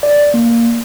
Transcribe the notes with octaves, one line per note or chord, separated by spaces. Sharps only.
D5
A#3